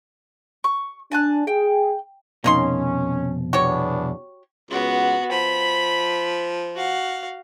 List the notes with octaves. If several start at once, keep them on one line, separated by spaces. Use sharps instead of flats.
C#6
D4 G#5 A5 F#6
G#4 G5
C2 F2 B2 A#3 C#4 D#4 C6
E2 B3 D4 F#4 G4 C#5
C#2 B3 F#4
F3 B5
F#4 F5